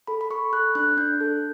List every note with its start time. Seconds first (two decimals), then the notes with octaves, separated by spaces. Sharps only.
0.07 A4 B5
0.21 B5
0.30 A4 C#6
0.53 A4 F#6
0.75 D4 F#6
0.97 D4 G6
1.21 A4